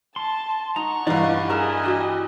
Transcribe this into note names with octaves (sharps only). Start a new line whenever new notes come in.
A5 C6
D#4 F#5 A#5 C#6
G2 E3 B4 D5 D#5 F5
E4 G#4 A#4 D#5 G#5 A5 F6
D4 F#4 G4